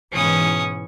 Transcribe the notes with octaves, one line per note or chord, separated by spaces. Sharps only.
G#2 B2 E3 C#4 D#6